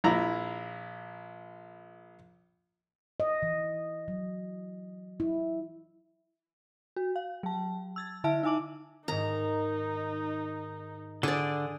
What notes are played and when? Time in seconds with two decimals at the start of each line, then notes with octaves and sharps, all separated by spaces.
0.04 A#1 E4 A#5
3.20 D#5
3.43 E3
4.08 F#3
5.20 E4
6.96 F#4
7.16 F5
7.43 F#3 A5
7.96 E6 G#6 A6
8.24 D3 E4 E5 A5 D7
8.43 D#4 E5 G#5 D6 F#7
9.08 G#2 D#3 D#4 A#5
11.23 D3 G#4 D5